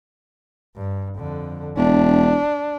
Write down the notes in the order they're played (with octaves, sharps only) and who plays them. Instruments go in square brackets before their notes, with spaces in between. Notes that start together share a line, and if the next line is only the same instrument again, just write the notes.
[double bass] G2
F2 D3
[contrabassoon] E1 [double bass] D4